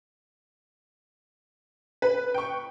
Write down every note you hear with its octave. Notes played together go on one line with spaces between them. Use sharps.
B4
G5 C#6